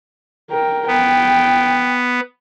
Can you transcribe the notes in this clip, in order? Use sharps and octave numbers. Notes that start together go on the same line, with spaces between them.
A#4 G5
B3 G5